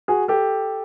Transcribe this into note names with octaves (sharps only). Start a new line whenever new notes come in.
F#4 G#4
G4 A4